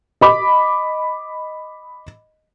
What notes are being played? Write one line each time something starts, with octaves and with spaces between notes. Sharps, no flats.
D#5 B5 D6